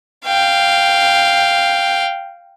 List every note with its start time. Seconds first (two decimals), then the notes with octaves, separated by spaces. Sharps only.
0.25 F5 G5